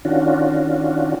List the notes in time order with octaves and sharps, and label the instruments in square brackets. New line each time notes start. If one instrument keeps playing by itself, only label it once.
[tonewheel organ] D#3 C#4 D4 F4 F#4